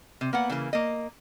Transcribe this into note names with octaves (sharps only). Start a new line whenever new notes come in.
C3
A#3 B3 F#5
C#3 E3 A#3
A#3 D#5